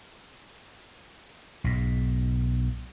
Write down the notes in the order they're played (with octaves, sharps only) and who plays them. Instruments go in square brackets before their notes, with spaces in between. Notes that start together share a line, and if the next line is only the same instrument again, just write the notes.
[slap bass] B1 G#2